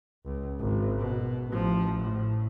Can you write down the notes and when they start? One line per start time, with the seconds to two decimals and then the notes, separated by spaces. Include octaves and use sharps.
0.25 C#2
0.59 G#1
0.99 B2
1.48 A1 F3
2.00 A2